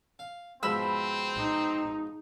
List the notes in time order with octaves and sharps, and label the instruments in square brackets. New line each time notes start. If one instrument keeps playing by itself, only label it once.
[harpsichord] F5
[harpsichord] G#2 B2 F3 [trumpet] C4 [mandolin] B5 E6
[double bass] D#4